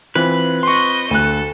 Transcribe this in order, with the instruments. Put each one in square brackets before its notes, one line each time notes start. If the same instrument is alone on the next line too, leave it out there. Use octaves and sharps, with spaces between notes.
[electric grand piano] E3 [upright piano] C4 F4 B5 [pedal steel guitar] B4
[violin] D#5 G6 [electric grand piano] C6 C#6
[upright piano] D2 F#6 [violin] A4 [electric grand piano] D#7